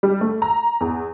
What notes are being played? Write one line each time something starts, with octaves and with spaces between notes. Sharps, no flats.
G3
A3
A#5
E2